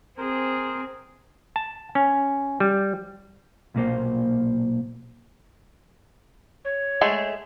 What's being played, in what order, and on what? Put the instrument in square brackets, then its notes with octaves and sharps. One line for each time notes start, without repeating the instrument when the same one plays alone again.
[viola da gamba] C4 G#4 [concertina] A#4 C5
[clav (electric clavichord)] A5
C#4
G3
[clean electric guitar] B1 A#2 A#3 C5
[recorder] C#5
[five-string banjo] G#3 A3 G#4